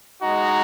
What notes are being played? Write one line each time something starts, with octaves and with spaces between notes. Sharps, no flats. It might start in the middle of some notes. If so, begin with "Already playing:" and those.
G#3 D#4 F#4 A#5